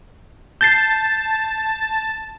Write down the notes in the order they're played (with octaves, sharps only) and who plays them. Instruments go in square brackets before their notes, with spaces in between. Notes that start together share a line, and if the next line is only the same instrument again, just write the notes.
[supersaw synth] A5 [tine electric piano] G6 A6 C7